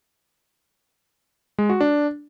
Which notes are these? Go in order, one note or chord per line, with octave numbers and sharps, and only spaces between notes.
G#3
F#4
D4